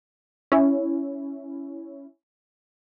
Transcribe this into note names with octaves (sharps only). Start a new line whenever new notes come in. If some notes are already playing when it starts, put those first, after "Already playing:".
C#4 E4